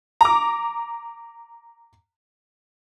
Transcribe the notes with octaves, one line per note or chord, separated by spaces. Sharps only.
A#5 D6